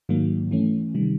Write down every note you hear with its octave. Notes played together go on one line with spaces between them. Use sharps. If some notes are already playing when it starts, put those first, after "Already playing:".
G#2 D#3 F#3 A#3
E3 A3 C#4
C3 D#3 G3